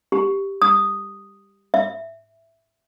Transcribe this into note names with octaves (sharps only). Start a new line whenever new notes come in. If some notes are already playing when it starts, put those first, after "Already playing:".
G4
D#6
E5